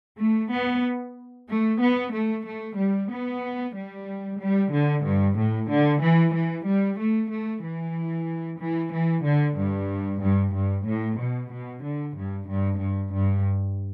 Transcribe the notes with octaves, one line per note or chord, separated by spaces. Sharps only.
A3
B3
A3
B3
A3
A3
G3
B3
G3
G3
D3
G2
A2
D3
E3
E3
G3
A3
A3
E3
E3
E3
D3
G2
G2
G2
A2
B2
B2
D3
G2
G2
G2
G2